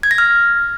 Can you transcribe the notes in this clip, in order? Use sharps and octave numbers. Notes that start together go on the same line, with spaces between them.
G#6
A#6
F6